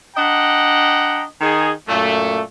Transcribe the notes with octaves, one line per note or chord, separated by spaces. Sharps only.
D4 D#5 F#5 G5 A#5
D#3 D#4 G#4
F#2 A#2 A3